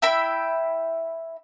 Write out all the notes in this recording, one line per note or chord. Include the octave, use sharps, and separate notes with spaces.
E4 E5 G5 B5